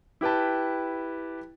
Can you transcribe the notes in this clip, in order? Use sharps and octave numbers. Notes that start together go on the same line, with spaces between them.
E4 G4 B4 G5 A5